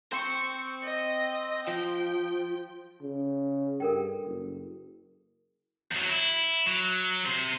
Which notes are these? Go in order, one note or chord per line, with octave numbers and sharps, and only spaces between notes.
C4 C5 C#6
D#5
F3 G5
C#3
G2 A4 A#4 G5
F#1
E2 F#3
E4
F#3
C3 C5